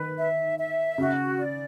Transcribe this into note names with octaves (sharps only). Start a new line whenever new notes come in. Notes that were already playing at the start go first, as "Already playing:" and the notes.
Already playing: D#3 B4
E5
E5
C#3 F#4
D5